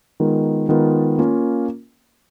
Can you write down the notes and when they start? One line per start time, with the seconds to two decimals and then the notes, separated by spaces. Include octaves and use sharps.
0.20 D#3 G#3 B3 F4 A#4
0.69 D#3 G#3 B3 F4 A#4
1.19 A#3 C#4 F4 A#4